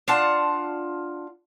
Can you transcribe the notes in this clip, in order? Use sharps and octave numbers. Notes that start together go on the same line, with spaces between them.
D4 F4 F#5 A5